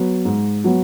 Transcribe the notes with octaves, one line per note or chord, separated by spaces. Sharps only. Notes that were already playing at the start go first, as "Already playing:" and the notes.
Already playing: F#3 B3
G#2
F#3 B3